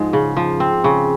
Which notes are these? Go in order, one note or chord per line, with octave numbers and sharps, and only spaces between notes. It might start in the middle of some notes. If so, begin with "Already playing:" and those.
Already playing: G#2 F3 G#3
C#3
F3
C4
C#3